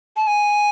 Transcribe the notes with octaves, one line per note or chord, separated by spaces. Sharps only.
A5
G#5